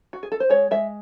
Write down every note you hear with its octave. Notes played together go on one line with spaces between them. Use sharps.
F#4
G#4
A4
C5
G#3 C#5
G#3 E5